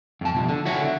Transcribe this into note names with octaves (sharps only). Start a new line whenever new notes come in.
F2 A5
B2 F3
D3
E4 F#4 C#5
D3